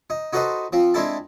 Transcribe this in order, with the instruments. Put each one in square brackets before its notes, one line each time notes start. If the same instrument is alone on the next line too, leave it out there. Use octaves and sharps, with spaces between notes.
[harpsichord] D#4
D#4 F#4 A4 B4 C5 D#5
F3 C4
G#3 C4 D4 E4 A4 A5